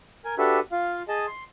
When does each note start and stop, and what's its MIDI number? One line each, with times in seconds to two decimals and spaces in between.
0.25 0.35 70
0.25 0.35 80
0.38 0.59 62
0.38 0.59 66
0.38 0.59 67
0.38 0.59 69
0.38 0.59 71
0.38 0.59 76
0.72 1.02 65
0.72 1.02 77
1.08 1.26 68
1.08 1.26 75
1.08 1.26 81
1.27 1.43 84